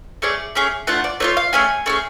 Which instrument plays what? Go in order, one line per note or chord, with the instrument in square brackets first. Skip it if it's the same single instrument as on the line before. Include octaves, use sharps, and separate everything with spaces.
[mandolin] A3 C#4 G#4 D5
A3 C#4 G#4
A3 D4 F4 F#5
D5
A3 D4 F4 C#5
F5
A3 C#4 G#4 G#5
A3 C#4 G#4